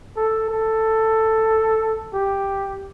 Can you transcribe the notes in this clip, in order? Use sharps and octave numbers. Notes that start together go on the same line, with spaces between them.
A4
A4
G4